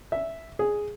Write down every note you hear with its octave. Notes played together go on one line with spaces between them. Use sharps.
E5
G#4